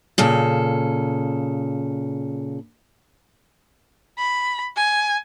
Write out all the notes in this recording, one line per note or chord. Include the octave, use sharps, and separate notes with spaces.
A#2 C#3 A4
B5
G#5